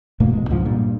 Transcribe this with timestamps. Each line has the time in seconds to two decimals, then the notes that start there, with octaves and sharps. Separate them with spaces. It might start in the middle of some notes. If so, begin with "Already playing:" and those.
0.20 G2 B2 A3 A#3
0.33 A1 B2 G#3
0.49 C#2 G#2 F3
0.65 G2 A#2